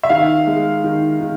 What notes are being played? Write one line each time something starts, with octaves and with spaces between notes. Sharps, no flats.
E5
D#3 F5
G#3
D#3
D#3